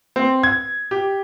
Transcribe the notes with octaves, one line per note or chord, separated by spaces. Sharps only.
C4
G#6
G4